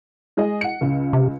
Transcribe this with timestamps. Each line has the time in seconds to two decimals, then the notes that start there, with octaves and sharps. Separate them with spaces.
0.37 G#3 G#4 D#5
0.61 F#5 C#7
0.81 C#2 C#3
1.13 C3